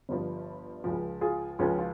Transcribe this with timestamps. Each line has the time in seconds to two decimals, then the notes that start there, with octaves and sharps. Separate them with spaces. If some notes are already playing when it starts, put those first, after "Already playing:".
0.09 G1 G2 F3
0.84 C#2 C#3 F3
1.21 F4 G#4
1.59 C#2 C#3 F3 C#4 F4
1.78 F4